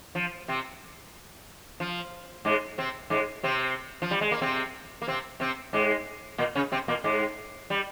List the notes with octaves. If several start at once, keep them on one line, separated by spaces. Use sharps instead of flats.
F3
C3 C4
F3
G#2 G#3
C3 C4
G#2 G#3
C3 C4
F3
G3
G#3
A#3
C3 C4
A#3
C3 C4
C3 C4
G#2 G#3
A#2 A#3
C#3 C#4
C3 C4
A#2 A#3
G#2 G#3
G3